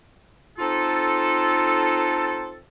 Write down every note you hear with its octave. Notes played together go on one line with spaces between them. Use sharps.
C4 D#4 F4 A4